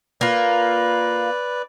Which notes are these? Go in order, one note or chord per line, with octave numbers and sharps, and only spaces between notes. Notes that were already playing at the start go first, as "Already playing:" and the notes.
A#3 F4 B4 D5